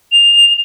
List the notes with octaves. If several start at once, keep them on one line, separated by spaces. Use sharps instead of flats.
F7